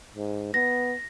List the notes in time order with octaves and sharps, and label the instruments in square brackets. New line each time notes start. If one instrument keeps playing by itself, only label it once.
[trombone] G#2
[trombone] B3 [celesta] A#6